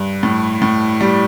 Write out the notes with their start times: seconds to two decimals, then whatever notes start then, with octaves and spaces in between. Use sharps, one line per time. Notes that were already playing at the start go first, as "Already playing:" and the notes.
Already playing: G2
0.23 A2
0.62 A2
1.01 G3